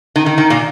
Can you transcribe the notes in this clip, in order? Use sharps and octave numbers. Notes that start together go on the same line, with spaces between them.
D#3
D#3
D#3
A#2